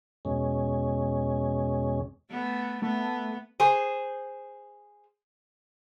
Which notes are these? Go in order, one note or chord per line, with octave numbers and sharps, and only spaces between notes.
E2 B2 G#3 C#4
A3 B3
A3 B3
G#4 C5